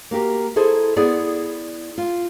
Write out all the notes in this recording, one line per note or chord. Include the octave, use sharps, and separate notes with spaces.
A#3 F#4 G4 A#4
E4 G#4 A4 C5
B3 E4 G#4 D5 F#5
F4